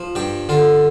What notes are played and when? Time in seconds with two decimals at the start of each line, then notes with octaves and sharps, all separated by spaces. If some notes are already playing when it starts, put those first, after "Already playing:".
Already playing: F3
0.15 G2 G4
0.49 D3 F4